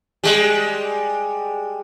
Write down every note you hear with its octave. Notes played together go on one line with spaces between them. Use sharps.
G3 G#3